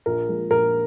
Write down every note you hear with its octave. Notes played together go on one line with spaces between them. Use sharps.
A#1 A#4
A#2 F3 G#3
A#1 A#4